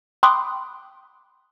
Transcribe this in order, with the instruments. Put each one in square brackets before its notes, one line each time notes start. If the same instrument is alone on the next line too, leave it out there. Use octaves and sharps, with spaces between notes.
[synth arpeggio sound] G5 B5 C6 D6 D#6 F#6